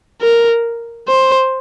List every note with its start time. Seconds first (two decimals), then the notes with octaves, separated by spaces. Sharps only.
0.22 A#4
1.08 C5